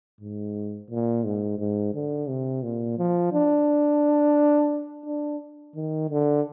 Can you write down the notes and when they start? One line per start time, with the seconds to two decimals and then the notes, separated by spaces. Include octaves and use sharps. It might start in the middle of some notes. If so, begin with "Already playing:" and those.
0.21 G#2
0.90 A#2
1.24 G#2
1.59 G#2
1.94 D3
2.29 C3
2.63 A#2
2.98 F3
3.33 D4
5.06 D4
5.76 D#3
6.10 D3